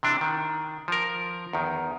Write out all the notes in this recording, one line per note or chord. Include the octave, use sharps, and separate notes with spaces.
C3 E3 D4
D#3
F3 A#4
E2 D#3